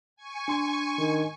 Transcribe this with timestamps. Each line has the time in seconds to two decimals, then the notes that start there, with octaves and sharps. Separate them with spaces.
0.16 G#5 C#6
0.48 D4 C6
0.99 D#3